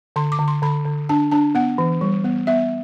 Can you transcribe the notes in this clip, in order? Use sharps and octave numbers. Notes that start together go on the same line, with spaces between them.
D3 C6
D6
D3
C6
D3 B5
D3
D4 A5
D4 A5
B3 F#5
E3
G3
B3
B3 E5